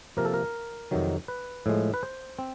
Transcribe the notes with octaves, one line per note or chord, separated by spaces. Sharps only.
C3 F3 A#3 A#4
A4
A#4
F2 C3 D#3 F#3
B4
A2 F3 G#3
B4
C5
C4